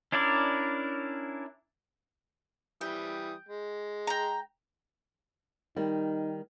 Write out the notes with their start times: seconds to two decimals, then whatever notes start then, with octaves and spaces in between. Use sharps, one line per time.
0.12 C#4 D4 E4 A#4 D5
2.81 E3 G3 G5 D#6
3.49 G#3
4.07 G5 A#5
5.76 D#3 G3 D#4